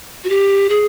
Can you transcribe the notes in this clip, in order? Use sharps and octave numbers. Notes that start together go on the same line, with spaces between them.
F#4
G4
G#4